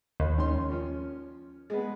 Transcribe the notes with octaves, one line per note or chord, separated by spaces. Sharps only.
D#2
D#3 C#4 C6
F3 C#4
G#3 B3